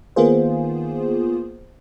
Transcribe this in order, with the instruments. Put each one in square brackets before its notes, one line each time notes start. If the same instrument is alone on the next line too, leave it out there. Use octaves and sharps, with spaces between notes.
[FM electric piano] D#3 A#3 B3 F4 G#4 C5